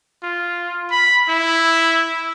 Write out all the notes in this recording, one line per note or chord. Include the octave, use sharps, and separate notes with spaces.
F4
B5
E4